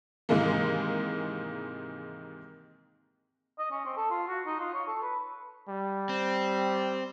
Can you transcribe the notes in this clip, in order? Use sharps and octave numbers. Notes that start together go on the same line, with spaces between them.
G#2 C3 D#3 E3 G#3 A#3
D#5
C#4
C4
A4
F4
F#4
D#4
F4
C#5
A4
B4
G3
C4